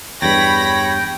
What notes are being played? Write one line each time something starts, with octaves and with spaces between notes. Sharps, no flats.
E2 G2 C#5 G5 B5 A#6